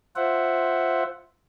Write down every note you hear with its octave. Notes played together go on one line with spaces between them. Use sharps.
F4 C5 E5 F#5